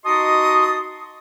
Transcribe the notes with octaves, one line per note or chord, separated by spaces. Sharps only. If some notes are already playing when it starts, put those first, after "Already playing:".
D#4 F#4 D#5 A5 C6 D#6